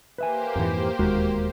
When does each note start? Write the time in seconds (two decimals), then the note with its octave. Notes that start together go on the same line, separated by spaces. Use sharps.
0.18 A#3 G4 B4 C5 E5 G#5
0.55 F2 G#2 E3
0.99 E1 D#2 G#3 F#4 A#4